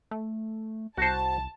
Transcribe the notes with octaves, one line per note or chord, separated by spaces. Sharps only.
A3
C2 F#4 C5 A5